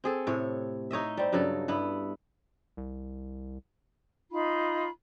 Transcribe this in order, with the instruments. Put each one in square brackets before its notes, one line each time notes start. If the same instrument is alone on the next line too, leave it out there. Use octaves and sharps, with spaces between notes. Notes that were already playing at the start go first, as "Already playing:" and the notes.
[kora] C4 G#4 A4
A2 C3 C#5
D#4 C#5 D#5 E5
G3 C4
G2 C#3 F#3 A4
G2 B3 E4
[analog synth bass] C2
[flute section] D#4 F4 B5